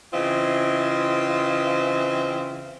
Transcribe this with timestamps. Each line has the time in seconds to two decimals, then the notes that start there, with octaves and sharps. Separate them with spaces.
0.13 C#3 E3 C4 F4 D#5 E5